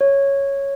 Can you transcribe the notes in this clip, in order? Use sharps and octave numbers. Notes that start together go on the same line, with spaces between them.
C#5